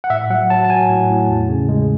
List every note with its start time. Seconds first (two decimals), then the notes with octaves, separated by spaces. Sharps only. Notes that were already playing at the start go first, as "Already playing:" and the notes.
0.04 F#5
0.10 A2 E5
0.30 F#3 F#5
0.50 F#3 A5
0.64 A5
0.70 F#3 G#5
0.89 A2
1.10 A2
1.29 E2
1.49 C#3
1.69 G#3